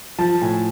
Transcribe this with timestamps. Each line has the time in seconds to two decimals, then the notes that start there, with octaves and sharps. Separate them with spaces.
0.19 F3 A5
0.41 A2 G#5